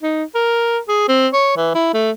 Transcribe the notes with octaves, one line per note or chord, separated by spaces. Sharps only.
D#4
A#4
G#4
C4
C#5
E3
E4
A3